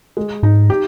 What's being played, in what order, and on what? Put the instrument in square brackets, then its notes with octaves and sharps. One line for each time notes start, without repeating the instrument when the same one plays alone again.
[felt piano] G#3
[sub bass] G#2 [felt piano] D#4
[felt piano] G4